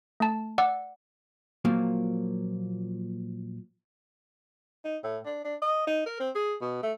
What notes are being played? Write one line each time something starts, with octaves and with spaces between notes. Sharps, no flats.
A3 A5
D5 F#5 D6 E6
A#2 F3 F#3 A#3
D#4
A2
D4
D4
D#5
D#4
A#4
C4
G#4
B2
A3